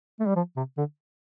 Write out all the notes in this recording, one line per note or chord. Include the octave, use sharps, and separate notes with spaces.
A3
G3
F3
C3
D3